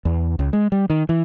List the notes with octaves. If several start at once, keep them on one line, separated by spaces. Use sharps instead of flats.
E2
C#2
G#3
G3
D#3
E3